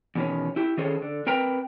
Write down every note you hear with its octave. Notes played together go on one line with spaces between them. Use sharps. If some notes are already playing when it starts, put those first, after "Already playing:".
E2 B2 D#3 C#4
E4 G4
D#3 C#4 G#4 A4 C5 C#5
D3
C4 A#4 B4 G5 A#5